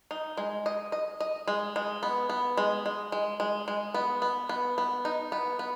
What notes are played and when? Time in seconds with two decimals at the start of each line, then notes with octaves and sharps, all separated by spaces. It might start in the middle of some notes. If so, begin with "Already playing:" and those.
0.11 D#4
0.38 G#3
0.66 D#5
0.92 D#5
1.21 D#5
1.48 G#3
1.76 G#3
2.03 B3
2.30 B3
2.57 G#3
2.86 G#3
3.12 G#3
3.40 G#3
3.68 G#3
3.94 B3
4.22 B3
4.49 B3
4.78 B3
5.05 D#4
5.32 B3
5.59 B3